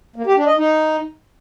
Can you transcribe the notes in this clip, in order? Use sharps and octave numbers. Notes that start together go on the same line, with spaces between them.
A#3
G4
D4
D#5
D#4